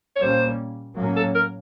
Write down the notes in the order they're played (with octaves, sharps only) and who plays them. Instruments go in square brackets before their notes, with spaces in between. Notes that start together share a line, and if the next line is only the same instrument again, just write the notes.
[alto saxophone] C#5
[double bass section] A#2 G3 A#3 C#4 [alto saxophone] C5
[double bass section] A2 F#3 A#3 C#4
[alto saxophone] A4
A#4